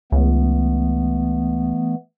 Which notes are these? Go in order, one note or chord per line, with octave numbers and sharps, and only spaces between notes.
C#2 E3 A3 B3